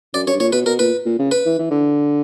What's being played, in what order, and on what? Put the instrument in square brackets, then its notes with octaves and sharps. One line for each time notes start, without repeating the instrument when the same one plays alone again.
[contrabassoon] F#2 [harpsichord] D5
[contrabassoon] F#2 [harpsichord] C#5
[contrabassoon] G2
[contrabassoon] A#2 [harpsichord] C#5
[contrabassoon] B2 [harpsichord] B4
[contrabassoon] B2 [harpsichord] A#4
[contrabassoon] A#2 [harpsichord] B4
[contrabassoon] A#2
C#3
[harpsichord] B4
[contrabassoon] E3
E3
D3